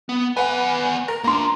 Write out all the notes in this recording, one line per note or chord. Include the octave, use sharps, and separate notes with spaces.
B3
B3 B4 F#5 G#5
A#4
A#3 D4 A#5 C6